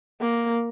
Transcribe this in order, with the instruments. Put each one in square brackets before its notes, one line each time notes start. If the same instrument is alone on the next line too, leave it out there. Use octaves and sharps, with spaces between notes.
[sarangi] A#3